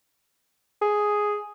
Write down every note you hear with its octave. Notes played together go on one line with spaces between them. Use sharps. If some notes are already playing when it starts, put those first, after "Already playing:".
G#4